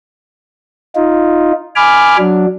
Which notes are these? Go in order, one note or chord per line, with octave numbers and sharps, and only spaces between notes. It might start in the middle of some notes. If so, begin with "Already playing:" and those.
D#4 F4
G#5 B5 D6 F6
F#3 D4